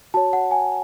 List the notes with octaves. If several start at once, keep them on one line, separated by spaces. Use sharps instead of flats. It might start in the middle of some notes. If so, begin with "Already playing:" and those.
F#4 C#5 A5
F#5
G#5